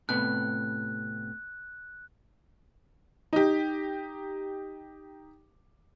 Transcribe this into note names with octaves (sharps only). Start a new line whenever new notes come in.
A2 C3 B3 F#6
D#4 G4